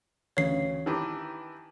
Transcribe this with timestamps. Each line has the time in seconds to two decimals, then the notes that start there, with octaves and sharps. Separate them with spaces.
0.37 A1 D2 C#3 C#5 C7
0.86 D#3 E3 G4 A5 A#5 D6